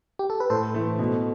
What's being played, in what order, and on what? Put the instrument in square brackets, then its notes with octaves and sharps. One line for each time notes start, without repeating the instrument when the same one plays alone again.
[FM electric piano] G4
A4
B4
[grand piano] A2 [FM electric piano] A4 C5
[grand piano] E3 A3
B2